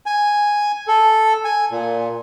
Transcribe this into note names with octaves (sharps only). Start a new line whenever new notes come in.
G#5
A4
G#5
A#2